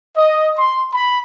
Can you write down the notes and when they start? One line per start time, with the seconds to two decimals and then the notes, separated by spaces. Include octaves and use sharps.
0.16 D#5
0.58 C6
0.93 B5